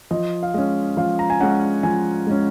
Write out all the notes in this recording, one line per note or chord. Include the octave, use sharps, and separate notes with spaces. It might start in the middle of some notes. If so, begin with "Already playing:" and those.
F3 D#5
F5
G#3 C#4 D#5
F3 F5
A#5
G#5
G#3 C#4 F#5
F3 G#5
G#3 C#4